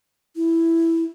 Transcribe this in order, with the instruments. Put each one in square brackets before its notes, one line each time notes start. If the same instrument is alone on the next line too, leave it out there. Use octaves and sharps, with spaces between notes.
[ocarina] E4